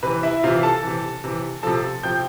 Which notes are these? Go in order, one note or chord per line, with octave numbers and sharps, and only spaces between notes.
C3 E3 B4
E4 E5
C3 E3 F4 F5
A4 A5
C3 E3
C3 E3
C3 F3 A4 A5
C3 F3 G5 G6